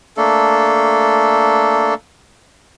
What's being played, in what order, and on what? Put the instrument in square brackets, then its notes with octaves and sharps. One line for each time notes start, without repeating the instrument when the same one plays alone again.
[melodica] A3 A#3 D4 A4